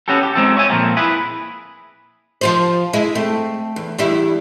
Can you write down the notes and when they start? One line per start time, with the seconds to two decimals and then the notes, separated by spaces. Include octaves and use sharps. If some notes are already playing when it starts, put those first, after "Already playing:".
0.08 B3 C#4 F#4 G4 A4
0.23 G4
0.35 G#3 C4 D#4 F4 A4
0.57 C#5 E5 G#5
0.69 A#2 F3 A3 A#3 C4
0.97 E4 G#4 B4
2.41 F3 F4 C5
2.93 G#3 E4
3.15 A3 C4
3.76 E2
3.98 E2 G3 E4